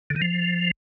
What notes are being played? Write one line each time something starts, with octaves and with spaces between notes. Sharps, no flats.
D3
D#3
F3